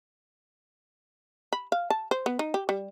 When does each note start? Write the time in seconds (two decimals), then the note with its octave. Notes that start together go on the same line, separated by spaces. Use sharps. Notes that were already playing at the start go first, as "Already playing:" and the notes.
1.53 B5
1.72 F5
1.90 A5
2.11 C5
2.26 B3
2.39 D#4
2.54 G4
2.69 G3